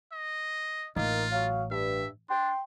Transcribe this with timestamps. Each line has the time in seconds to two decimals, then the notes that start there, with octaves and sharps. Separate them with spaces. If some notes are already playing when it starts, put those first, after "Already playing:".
0.12 D#5
0.96 A1 A#3 D#4 F4
1.32 F#3 F5
1.71 G2 E5
2.29 D4 G5 C6